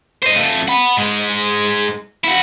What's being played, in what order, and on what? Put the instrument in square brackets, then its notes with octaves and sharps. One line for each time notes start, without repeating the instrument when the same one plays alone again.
[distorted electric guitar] C5 D#5
F2 A3
F#5 B5
G#2 G#3
E4 F#4